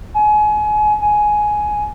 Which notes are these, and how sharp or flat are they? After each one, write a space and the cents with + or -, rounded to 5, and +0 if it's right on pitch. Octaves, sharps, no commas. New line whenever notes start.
G#5 +30
G#5 +10